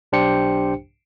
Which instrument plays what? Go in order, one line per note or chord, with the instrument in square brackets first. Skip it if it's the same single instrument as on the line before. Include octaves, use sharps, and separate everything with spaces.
[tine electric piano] B1 D4 G4 C5 G5 C#7